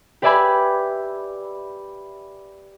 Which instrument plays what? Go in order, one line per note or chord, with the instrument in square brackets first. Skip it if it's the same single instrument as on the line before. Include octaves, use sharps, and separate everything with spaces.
[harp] G4 B4 D5 E5 G#5 B5